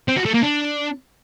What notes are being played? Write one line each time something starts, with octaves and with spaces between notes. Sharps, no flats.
C4
F#4
A3
A#3
D4